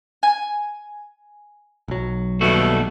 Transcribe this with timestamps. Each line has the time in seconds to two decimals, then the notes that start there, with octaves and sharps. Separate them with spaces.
0.23 G#5
1.88 B1 F#3
2.41 D#2 B2 G3 A3 F#4